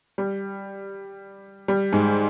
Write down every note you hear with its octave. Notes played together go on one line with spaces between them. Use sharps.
G3
G3
G#2 G#3